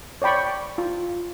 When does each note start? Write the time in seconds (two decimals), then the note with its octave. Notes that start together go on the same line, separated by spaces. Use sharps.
0.22 C#5 D5 G5 B5 C#6
0.78 F4